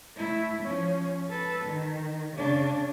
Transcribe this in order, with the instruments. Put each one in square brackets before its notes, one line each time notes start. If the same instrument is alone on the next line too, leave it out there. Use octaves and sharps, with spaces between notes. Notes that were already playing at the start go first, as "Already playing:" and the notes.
[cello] A3 E4
F3 C#4
A4 B4
D#3
C#3 D4